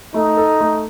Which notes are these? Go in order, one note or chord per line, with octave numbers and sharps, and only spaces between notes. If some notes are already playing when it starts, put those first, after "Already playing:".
A3 D#4
A4
A3